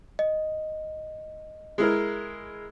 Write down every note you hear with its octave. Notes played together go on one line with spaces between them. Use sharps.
D#5
G#3 E4 A#4